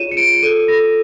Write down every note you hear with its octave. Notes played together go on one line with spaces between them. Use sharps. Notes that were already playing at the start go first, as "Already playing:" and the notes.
Already playing: F4 G#4 C#5 D#7 E7
C#7
F4 D7
A4 D#7
A4 A#6